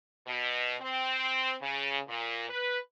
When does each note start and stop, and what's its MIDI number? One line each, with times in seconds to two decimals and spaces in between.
0.27 0.75 47
0.80 1.54 60
1.62 1.99 49
2.08 2.47 46
2.50 2.78 71